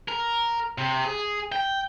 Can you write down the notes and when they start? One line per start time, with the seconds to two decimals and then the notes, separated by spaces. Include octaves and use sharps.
0.08 A#4
0.78 C3
1.05 G#4
1.52 G5